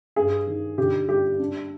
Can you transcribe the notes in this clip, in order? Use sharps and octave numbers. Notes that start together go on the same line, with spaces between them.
G2 G#4
D#3
D3 G4
G3 G4
D4